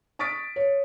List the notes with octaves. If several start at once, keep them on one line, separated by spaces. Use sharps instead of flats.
C#6 D#6 A6 B6 D7
C#5